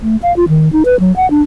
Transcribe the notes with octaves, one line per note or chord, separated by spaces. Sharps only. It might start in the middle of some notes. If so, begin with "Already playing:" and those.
A3
F5
F4
D#3
D#4
B4
F#3
F#5
D4